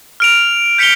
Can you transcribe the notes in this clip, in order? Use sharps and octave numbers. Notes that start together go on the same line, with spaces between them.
F6 D7 F7
G6 B6 C#7 D7 F7 G7